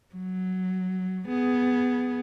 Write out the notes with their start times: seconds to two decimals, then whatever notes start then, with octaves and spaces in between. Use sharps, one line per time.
0.15 F#3
1.28 B3 G#4